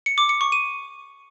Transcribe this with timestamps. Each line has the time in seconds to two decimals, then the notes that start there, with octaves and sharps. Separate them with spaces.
0.06 C#7
0.18 D6
0.29 C#7
0.41 C#6
0.52 D#7